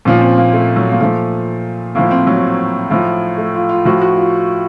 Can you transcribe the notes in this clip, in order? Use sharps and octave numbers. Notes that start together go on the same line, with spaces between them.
A#2 F3 C#4
C4
A#3
A3
F#3
A#3
A#2 F3 A3
A2 F3 A#3
C4
F#3
A2 F3
A3
F4
F4
A2 F3 F#4
F#4
F4